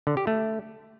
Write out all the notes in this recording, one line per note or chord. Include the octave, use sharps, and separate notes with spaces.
D3
G4
A3